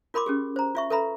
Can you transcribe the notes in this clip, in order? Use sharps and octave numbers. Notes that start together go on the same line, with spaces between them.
F4 A#4 B5 C6 D6
C#4 G4 G#4
C5 A#5
F4 E5 C#6
A4 B4 E5 A#5 B5